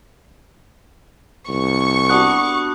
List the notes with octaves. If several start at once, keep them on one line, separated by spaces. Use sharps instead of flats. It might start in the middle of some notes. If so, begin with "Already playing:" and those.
C2 C#6
B3 D4 F#4 D#6 F#6